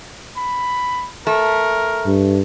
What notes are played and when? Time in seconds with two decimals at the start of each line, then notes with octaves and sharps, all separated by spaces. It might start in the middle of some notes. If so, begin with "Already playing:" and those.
0.37 B5
1.27 A3 A#4
2.06 G2